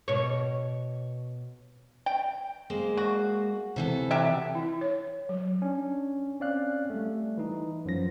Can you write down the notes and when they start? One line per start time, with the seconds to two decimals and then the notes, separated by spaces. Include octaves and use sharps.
0.08 B2 C#5
2.06 G5
2.70 G#3 A#3 C5
2.97 F#4
3.76 C3 E3 A4
4.11 F#3 G4 E5
4.55 E4
4.81 C#5
5.29 F#3
5.62 C#4 D4
6.40 C4 C#4 D5 F5 F#6
6.90 G3 A3
7.38 E3 D#4
7.85 F#2 F3 A#6